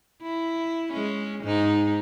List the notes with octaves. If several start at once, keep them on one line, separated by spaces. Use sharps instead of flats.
E4
G#3 C#4
G#2 D#4